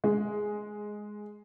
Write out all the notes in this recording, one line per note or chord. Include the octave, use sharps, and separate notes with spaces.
G#3